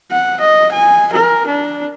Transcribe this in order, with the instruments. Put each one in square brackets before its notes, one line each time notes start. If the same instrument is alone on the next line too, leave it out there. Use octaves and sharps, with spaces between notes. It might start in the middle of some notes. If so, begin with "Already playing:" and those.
[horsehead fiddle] F#5
D#5
G#5
A#4
D4